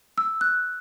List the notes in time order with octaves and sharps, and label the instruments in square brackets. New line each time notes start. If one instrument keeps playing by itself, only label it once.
[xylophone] E6
F#6